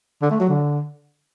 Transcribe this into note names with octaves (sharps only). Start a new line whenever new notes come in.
D3
A3
F#3
D3